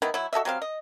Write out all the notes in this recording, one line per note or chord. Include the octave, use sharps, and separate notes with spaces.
D#3 B3 E4
F#3 E4
F#4 A4 D#5 E5
F#3 G3 C4 F5
D#5